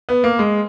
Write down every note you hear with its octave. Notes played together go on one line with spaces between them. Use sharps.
B3
A#3
G#3